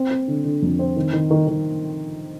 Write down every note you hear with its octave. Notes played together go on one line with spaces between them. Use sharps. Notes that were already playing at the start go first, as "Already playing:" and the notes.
Already playing: C4
C4
D3
D3
F2
C4
D#3
D#3
D#3
D#3